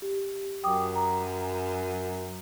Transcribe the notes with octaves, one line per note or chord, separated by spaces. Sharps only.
G4
F#2 G5 D6 D#6
A#5